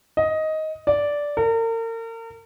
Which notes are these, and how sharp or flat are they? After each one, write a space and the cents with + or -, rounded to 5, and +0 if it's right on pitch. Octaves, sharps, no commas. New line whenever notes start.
D#5 +10
D5 -10
A#4 -40